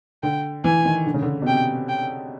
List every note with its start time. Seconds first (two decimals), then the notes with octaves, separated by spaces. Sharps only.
0.23 D3 G5
0.64 E3 G#5
0.85 D#3
1.06 D3
1.14 C#3
1.22 D3
1.42 B2
1.47 C3 G5
1.89 G5